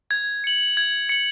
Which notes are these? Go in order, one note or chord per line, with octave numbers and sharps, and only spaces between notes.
G#6
C#7 F#7
G#6
C#7 F#7